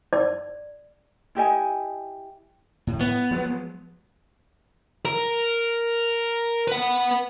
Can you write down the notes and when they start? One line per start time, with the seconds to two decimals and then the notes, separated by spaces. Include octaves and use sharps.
0.13 D5
1.35 E4 G4 D#5 G#5
2.87 A2
3.01 B3
3.31 F3 F#3 G#3
5.05 A#4
6.68 B4 F#5